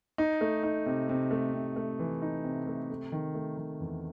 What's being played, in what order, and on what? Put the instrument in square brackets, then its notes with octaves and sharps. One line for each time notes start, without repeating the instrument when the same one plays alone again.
[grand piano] D#4
A3
D#4
C3
C3
A3
C3
A3
E3
D#4
C3
A3
A3
D#3
A3
D#3
E2